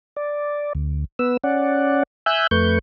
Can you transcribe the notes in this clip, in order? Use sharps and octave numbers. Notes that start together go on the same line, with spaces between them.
D5
D2
B3 B4 E6
C#4 D5 F#5
E5 G#5 E6 F#6 G6
F2 A3 B4 C#6 G6